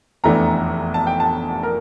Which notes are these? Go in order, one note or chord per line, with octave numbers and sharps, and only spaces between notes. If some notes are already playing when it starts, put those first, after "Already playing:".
F1 E2 E3 A3 D4 A#5
A5
G5
A5
A#4